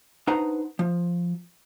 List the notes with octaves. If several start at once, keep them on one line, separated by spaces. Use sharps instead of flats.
D4 D#4 B4 C5 F#5 A#5
F3